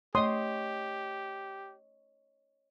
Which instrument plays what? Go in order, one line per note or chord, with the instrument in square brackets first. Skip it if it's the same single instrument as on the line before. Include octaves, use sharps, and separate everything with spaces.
[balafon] A3 [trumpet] G4 [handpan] C#5 D#5 [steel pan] C6 D#6